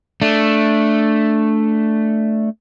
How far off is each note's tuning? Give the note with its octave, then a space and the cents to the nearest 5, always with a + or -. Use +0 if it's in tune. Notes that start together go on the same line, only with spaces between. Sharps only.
A3 +0 D4 +0